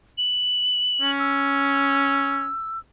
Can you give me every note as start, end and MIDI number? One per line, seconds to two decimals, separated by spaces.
0.18 1.11 102
1.01 2.49 61
1.19 2.79 88